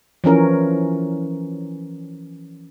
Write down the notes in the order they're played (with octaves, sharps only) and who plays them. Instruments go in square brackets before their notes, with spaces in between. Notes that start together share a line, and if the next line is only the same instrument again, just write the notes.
[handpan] E3 F3 C#4 A#4